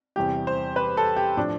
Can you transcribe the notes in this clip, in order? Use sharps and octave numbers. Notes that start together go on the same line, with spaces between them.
E2 C3 E3 G3 G4
C5
B4
A4
G4
A2 F3 D4